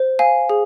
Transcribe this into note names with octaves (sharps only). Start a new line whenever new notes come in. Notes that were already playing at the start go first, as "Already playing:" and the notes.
Already playing: C5
F5 G#5
G#4